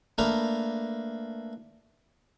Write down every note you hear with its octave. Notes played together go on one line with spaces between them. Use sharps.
A3 A#3 D4 A#4 B4 A#5